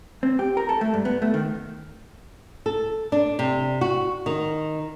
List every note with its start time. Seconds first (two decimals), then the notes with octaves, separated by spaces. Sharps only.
0.23 C4
0.39 G4
0.57 A#4
0.69 A4
0.81 A3
0.94 G2
1.05 B3
1.22 A3
1.34 D#3
2.66 A4
3.12 D4
3.39 C3
3.81 F#4
4.26 D#3